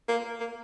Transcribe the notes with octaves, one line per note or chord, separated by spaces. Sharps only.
A#3
A#3